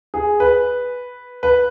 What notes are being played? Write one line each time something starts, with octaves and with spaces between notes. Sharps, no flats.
G#4
B4
B4